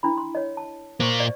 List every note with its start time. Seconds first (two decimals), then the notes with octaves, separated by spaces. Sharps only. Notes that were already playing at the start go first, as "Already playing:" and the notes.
0.03 D4 E4 B5
0.18 C6
0.35 C#5 D#5
0.57 A5
1.00 A#2 A#3 C5 C#6
1.20 D5 D#5